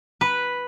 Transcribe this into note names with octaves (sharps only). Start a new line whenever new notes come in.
B4